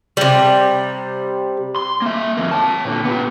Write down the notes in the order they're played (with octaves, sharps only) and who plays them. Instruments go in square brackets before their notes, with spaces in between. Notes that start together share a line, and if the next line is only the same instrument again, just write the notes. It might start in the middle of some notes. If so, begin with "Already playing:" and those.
[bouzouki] C3 G3
[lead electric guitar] C6
A#3 E5
F2 A#3
C#5 A5
A#2 D3
B3 G4